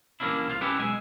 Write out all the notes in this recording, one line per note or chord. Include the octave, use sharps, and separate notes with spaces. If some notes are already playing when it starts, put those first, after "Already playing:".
E3 G3 A#3 C#4 D4 E4
C2 F4 F5
C#4 E4 G4 A4 B4 D5
B1 G#3 E5 G#5